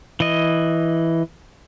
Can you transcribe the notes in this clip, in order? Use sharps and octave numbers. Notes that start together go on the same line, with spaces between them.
E3 D#5